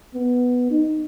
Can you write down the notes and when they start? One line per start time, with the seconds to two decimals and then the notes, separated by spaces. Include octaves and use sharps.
0.14 B3
0.71 D#4